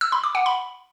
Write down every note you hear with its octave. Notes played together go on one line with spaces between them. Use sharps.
E6
B5
D6
F#5
B5